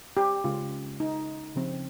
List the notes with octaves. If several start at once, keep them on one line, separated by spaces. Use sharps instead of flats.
G4
C#3 G#3 C#4 F4
D#4
C#3 F3 C4